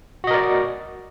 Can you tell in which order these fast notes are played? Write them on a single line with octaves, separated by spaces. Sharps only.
F#4 D#5 A#4 D5